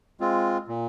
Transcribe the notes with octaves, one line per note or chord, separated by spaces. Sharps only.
G#3 C4 F4
A#2